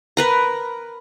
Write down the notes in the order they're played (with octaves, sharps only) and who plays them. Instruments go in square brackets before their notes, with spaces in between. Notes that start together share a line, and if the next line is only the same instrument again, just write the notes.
[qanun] A#4 B4 A#5